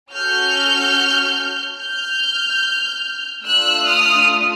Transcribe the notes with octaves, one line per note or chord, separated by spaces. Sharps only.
C#4 F#4 A4 F6 G6
F6 G6
A3 D4 F4 E6 F#6
D#6 F6